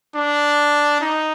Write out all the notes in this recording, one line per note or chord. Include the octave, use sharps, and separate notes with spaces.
D4
D#4